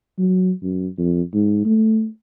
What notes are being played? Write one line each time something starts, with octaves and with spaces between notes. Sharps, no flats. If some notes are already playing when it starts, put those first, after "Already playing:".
F#3
F#2
F2
G#2
A3